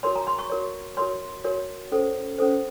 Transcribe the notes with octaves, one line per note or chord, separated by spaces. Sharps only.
F#4 A#4 C#5 C6
A#5
C6
C#6
F#4 A#4 C#5
F#4 A#4 C#5 C6
F#4 A#4 C#5
C#4 A4 C5
C#4 A4 C5